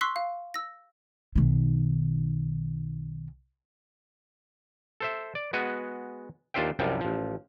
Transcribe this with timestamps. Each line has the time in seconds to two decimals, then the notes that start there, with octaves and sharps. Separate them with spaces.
0.01 C6 C#6 E6 F#6 B6 C7
0.16 F5
0.54 E6 A#6
1.36 B1 D#3
5.00 A4 C5 E5
5.35 D5
5.53 G#3 B3 F#4 G#5
6.54 D#2 D4 F4 C5 E5 G5
6.79 C2 F#2 C3 F3 G3
7.01 A1 F3